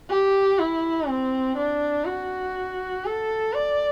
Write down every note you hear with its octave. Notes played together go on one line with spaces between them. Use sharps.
G4
E4
C4
D4
F#4
A4
D5